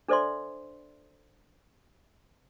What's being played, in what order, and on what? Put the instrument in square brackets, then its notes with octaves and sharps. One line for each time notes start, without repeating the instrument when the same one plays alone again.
[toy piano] D4 A4 C5 D5 E5 C6